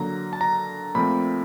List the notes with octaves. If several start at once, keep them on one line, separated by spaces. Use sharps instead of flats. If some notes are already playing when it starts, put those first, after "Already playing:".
Already playing: D3 F#3 A#3 A#5
A5
A#5
A#2 F3 A3 C4 B5